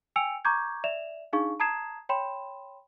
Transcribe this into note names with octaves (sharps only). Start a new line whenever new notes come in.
G5 G#5 E6 C#7 D7 F7
A#5 C#6 D6 G6 G#6
D5 E5 E7 F7
D4 D#4 G#4 F5 C#6
A5 A#5 D#6 G#6 C7 E7
C#5 G5 B5 C6 E7